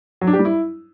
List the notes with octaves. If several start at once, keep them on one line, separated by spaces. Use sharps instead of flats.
F#3
D4
G4
G3
E4